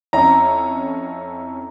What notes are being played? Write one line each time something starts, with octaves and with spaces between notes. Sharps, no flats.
F2 C#4 E4 A#5